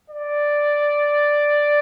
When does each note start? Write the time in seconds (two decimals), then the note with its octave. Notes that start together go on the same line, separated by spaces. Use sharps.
0.10 D5